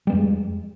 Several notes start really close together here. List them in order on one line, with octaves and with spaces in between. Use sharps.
G3 B3 F2 G#3